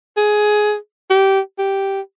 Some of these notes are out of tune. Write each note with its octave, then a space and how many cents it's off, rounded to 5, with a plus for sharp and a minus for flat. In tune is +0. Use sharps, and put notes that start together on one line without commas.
G#4 +15
G4 -20
G4 -5